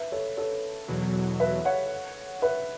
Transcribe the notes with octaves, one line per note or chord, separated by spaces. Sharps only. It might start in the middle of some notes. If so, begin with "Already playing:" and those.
Already playing: B4 E5
A4 C#5
A4 C#5
E2 B2 F#3
B4 E5
C#5 F#5
B4 E5